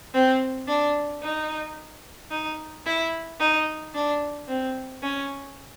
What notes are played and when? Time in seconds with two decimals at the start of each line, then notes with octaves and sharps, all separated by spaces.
0.14 C4
0.68 D4
1.22 D#4
2.31 D#4
2.86 E4
3.40 D#4
3.94 D4
4.48 C4
5.02 C#4